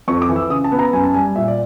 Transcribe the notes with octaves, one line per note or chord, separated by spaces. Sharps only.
F2 C#6
D6
E3
E6
C#3 D#6
A5
B3
A#5
F#2 G#5
A5
G3 G#5
A#2 E5
D5